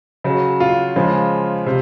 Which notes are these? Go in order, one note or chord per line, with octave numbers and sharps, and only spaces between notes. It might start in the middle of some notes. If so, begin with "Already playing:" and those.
C#3 F#3
F4
C#3 F3 G#3
C3